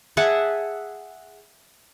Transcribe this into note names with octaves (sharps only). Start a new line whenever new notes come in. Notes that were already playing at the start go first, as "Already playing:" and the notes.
G#4 E5 F#5 A5